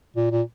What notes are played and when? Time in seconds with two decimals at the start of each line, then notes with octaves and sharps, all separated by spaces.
0.16 A#2
0.31 A#2